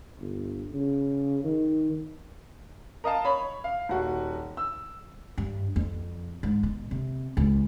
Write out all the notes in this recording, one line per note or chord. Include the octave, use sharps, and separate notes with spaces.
G1
C#3
D#3
A#4 D#5 F5 A5
C#5 B5
F5
D#1 F#4
E6
G2
F2
G#2
B2
C3
C#2